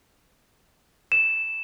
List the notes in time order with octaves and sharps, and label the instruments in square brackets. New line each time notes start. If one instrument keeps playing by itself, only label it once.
[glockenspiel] E7